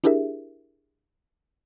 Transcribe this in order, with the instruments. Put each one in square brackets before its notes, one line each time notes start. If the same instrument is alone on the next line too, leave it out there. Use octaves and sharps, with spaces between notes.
[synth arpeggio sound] D4 E4 G4 G#4 A#4 E5